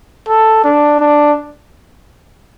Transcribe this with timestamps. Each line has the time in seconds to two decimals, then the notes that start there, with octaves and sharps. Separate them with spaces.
0.28 A4
0.64 D4
1.00 D4